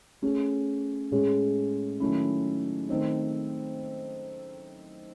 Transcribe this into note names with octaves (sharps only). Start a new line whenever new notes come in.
A3 C#4 G#4
A2 G#3 C#4 G#4 C#5
D#3 F#3 A3 C#4 E4
D#3 A3 C4 D#4